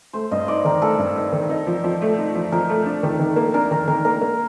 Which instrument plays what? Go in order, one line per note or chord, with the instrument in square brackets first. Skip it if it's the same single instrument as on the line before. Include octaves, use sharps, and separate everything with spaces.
[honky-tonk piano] A3 [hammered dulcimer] C5
[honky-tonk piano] G2 [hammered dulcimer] D#5
[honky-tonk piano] D#4 [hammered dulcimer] D5
[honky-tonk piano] D#3 [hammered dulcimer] A#4
[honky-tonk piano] A3 [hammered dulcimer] A4
[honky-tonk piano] G2
D#4
D#3
D#4
F3
F3
A3
D#4
F3
[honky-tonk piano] F3 [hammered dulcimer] A#4
[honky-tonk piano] A3
D4
D#3
D#3
A#3
[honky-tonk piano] D4 [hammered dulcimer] A#4
[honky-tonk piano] D#3 [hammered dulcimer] A#4
[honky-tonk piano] D#3 [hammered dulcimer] A#4
[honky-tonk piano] A#3 [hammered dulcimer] A#4
[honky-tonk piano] A#3